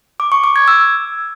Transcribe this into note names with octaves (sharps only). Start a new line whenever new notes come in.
D6
C#6
D6
G#6
E6